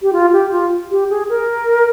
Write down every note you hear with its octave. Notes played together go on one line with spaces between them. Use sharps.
G4
F4
G4
F4
G4
G#4
A#4